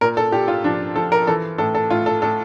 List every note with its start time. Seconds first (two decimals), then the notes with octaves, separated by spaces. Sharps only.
0.01 A#2 A#4
0.17 A4
0.32 A#2 G4
0.48 F4
0.64 F3 D4
0.96 F3 A4
1.12 A#4
1.27 E3 A4
1.58 A2 A4
1.75 A4
1.90 A2 F4
2.06 A4
2.22 A2 A4